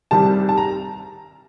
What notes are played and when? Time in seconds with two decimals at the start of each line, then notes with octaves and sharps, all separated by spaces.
0.11 C2 C3 D#3 G3 A5
0.49 A5
0.57 A#5